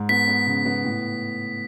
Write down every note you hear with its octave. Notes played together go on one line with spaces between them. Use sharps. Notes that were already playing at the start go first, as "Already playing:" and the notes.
Already playing: G#2
B3 B6
B3
C#3
B3
A2